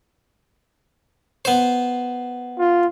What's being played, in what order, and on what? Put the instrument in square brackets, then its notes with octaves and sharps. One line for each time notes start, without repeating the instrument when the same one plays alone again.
[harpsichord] B3 C5
[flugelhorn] F4